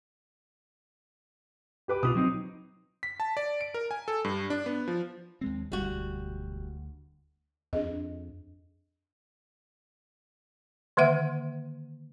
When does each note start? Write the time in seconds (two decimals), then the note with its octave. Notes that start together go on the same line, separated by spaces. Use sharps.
1.88 G4 B4 D6
2.03 B2 E4 F4 D#6
2.15 F#3 C4 D#4
3.03 B6
3.20 A5
3.37 D5
3.61 D7
3.74 A#4
3.91 G#5
4.08 A4
4.24 G2
4.50 D4
4.66 B3
4.88 F3
5.41 D#2 G#3 C4
5.72 E1 D2 G3 F#4
7.73 F2 D4 G#4 D#5
10.97 D3 D#3 A#3 E5 F#5